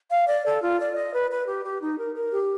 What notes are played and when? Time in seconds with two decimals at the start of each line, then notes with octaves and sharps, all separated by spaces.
0.09 F5
0.27 D5
0.44 A4
0.61 F4
0.78 D5
0.94 D#5
1.13 B4
1.30 B4
1.46 G4
1.63 G4
1.80 D#4
1.97 A#4
2.14 A#4
2.32 G4